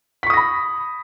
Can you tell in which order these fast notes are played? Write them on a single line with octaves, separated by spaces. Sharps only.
B6 C#6 D#6 A#6 B5